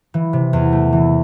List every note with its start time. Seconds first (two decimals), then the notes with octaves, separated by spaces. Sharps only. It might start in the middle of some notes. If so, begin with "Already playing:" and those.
0.14 E3
0.33 C3
0.53 E2
0.72 A3
0.93 E3